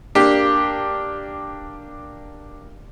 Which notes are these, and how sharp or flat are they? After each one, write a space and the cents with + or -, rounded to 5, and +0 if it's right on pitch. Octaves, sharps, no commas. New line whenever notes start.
A#3 +0 D4 +5 G4 +0